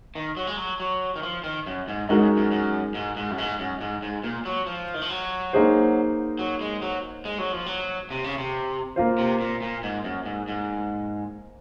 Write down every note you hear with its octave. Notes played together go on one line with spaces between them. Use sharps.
D#3
F#3
G#3
F#3
F#3
D#3
F3
D#3
F#2
G#2
G#2 G#3 D#4 F#4 A#4
F#2
F#2
F#2
G#2
G#2
F#2
G#2
F#2
G#2
G#2
A#2
F#3
F3
D#3
F3
F#3
A#3 D#4 G#4 C5
F#3
G#3
F#3
G#3
F#3
F3
F#3
C3
C#3
C3
A#3 F4 C5
C3
A#2
A#2
G#2
F#2
G#2
G#2